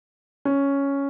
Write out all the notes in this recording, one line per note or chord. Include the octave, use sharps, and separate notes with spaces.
C#4